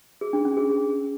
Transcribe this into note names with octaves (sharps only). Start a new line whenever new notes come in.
G#4
D4
C#4
G#4